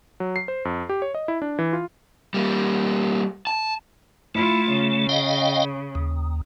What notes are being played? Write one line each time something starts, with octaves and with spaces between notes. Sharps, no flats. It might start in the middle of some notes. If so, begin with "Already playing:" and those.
F#3
C7
C5
F2
G4
C#5
D#5
E4
D4
E3
F4
G3 A#3
A5
A3 E4 F4
C#3
D#5 F5 G5
D#2